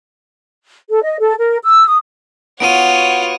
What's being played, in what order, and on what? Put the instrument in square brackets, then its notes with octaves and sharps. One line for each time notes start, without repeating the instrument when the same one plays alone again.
[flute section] A4
D#5
A4
A#4
E6
D#6
[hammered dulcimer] B3 F#4 [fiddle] F4 [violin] C#5 F#5 [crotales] D7 D#7